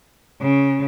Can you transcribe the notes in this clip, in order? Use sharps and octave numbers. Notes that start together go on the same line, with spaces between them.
C#3